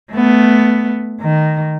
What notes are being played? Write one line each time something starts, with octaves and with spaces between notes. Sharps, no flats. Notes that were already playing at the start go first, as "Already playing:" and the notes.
A3 B3
D#3